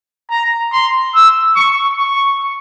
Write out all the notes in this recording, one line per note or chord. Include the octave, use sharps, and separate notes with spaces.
A#5
C6
E6
C#6
C#6